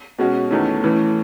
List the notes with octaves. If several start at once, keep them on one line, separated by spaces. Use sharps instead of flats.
B2 G#3 C#4 F#4
E2 D#3 A3 C#4
A2 E3 A3 C#4